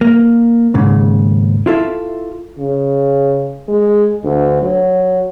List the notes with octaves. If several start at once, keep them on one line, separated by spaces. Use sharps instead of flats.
A#3
D#2 G#2 C#3
E4 F4 A4 E5
C#3
G#3
D2
F#3